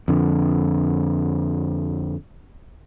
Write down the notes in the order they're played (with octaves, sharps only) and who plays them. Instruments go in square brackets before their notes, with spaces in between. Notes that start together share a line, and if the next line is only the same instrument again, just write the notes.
[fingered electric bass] F2 D3